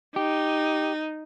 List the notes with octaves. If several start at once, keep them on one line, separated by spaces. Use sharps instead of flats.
D#4 G4